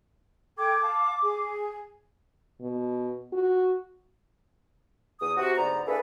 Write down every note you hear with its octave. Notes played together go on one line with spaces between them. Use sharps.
A4 G5 D6 G#6
F5 A5
G#4
B2
F#4
E2 D#6
C3 F#4
D2 G#2 D3 B3 C5 A#5
A#3 D4 E4 G#4 A4 B4